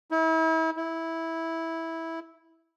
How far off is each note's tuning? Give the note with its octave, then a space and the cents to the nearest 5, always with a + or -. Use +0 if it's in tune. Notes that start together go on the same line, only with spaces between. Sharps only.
E4 -35
E4 -10